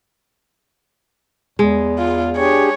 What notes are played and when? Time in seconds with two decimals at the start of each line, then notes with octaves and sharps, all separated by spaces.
1.59 E2 G#3
1.98 F4
2.37 D4 G4 G#4 C#5